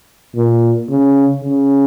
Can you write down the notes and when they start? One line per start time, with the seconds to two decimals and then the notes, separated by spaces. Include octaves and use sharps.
0.36 A#2
0.90 C#3
1.44 C#3